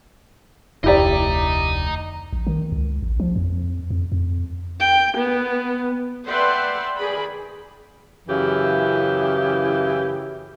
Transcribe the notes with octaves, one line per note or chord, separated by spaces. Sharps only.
F1 D2 E4 G4 D5 D#5 A#5
A#1
D#3
C#2
A1
F3
F2
F2
F2
G5
B3
B4 D5 E5 F#5 G5 C6
D#3 G#4 D5 B5
F#2 C#3 E3 E4 G4